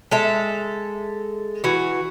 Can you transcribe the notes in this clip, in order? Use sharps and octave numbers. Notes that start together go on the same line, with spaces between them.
G#3 A4 E5
E3 F#4